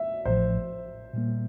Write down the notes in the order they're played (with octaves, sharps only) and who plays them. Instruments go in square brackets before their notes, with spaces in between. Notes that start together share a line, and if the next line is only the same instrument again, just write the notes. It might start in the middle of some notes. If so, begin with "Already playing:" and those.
Already playing: [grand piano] E5
[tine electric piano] A1 A2 F3 [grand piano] C5
[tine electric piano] A#2 G3 A#3